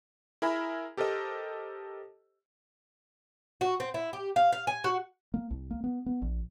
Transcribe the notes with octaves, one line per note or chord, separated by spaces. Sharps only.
E4 G#4 A#4 E5 G#5 B5
G4 A4 A#4 C5 D#5
F#4
C4
E4
G4
F5
F5
G#5
F#4
A#3
C2
A#3
B3
B3
A#1